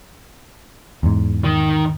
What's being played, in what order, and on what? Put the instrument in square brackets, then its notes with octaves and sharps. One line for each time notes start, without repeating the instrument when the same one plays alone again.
[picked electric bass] E2 G#2
[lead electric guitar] D#3